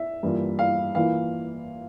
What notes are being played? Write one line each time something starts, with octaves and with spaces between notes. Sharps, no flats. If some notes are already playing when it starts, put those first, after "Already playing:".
Already playing: E5
G2 E3 A#3 F4
F5
E3 A#3 F4 F5